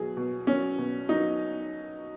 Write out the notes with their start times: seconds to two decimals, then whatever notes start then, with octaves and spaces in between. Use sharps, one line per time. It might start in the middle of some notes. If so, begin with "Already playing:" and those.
Already playing: B2 F#3 G#4
0.17 B2
0.47 F#3 C#4
0.78 B2
1.09 F#3 D#4